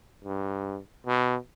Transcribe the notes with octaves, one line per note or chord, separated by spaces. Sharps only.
G2
B2